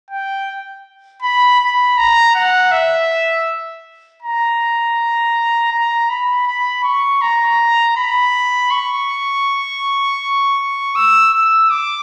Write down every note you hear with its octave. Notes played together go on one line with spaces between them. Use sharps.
G5
B5
B5
A#5
F#5
E5
A#5
A#5
B5
B5
C#6
A#5
B5
C#6
E6
E6
D6